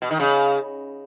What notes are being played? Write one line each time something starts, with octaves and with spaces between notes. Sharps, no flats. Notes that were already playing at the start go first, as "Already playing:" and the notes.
B2
D#3
C#3